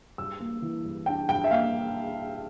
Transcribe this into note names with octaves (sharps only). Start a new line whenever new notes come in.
G2 E6
A#3
E3
G2
D4 G5
G2 G5
E5
A#3 F5